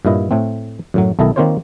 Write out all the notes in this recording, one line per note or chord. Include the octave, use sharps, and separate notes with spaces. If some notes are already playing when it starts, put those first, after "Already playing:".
G2 A#2 E4 D#5
A2 A3 C4
F#2 A2 F#3
B1 D#3 E4 A4 D#5
D#3 A#3 C4 F4 C5 C#5